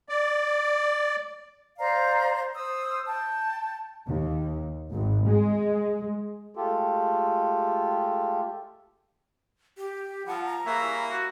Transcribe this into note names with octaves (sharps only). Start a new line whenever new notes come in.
D5
C5 D5 F5 A#5
C5 D#6 E6
G5 A5
D#2
G#1
G#3
G#3 A3 F4 G4 A4
G4
F3 G3 F#5 A5 E6
A#5
A#3 G#4 B4 C#5 E5
G3 E4
F#4